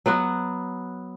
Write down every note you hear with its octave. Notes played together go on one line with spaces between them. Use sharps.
F#3 B3 F#4